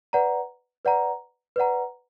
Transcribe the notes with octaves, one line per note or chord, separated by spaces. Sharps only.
B4 D5 F#5 A#5
B4 D5 F#5 A#5
B4 D5 F#5 A#5